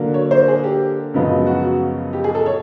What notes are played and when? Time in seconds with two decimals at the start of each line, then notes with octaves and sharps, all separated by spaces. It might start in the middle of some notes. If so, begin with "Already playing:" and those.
Already playing: D3 F#3 A#3
0.14 C#5
0.31 C5
0.48 G#4
0.64 G4
1.14 F#2 C#3 F3 G#3 B3
1.47 F#4
2.13 G4
2.24 G#4
2.35 A4
2.46 C#5